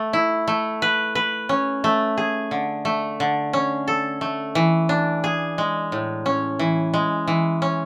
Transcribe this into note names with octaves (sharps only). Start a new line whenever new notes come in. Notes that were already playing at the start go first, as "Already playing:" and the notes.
Already playing: A3
E4
A3
B4
B4
C#4
A3
G#4
D3
A3
D3
C#4
A4
A3
E3
D4
G#4
G#3
A2
C#4
E3
G#3
E3
C#4